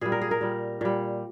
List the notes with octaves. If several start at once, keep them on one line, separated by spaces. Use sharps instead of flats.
A#2 G3 G#4
A#4
G#4
A#4
A#2 G3
A#2 G3